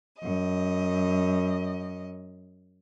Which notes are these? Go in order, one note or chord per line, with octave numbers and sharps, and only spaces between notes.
F#2 D#5